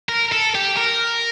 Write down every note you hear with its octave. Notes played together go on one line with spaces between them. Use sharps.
A#4
A4
G4
A#4